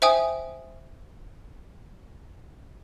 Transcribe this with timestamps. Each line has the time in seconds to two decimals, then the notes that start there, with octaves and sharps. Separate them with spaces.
0.02 C5 E5 G5 G#5 D#6